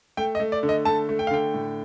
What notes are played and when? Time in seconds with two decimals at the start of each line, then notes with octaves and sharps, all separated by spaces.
0.17 A3 G5
0.35 D#5
0.40 A3
0.52 D5
0.63 D3
0.69 D#5
0.85 A3 A5
1.09 A3
1.19 G5
1.27 F5
1.31 D3 G5
1.54 A2